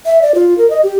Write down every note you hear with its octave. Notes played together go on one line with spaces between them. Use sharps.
E5
D5
F4
A#4
D#5
G4